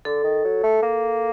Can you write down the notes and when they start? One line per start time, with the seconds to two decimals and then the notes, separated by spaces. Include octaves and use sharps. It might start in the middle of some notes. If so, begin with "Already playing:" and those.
0.05 D3 A4
0.24 D#3
0.44 F#3
0.64 A3
0.82 A#3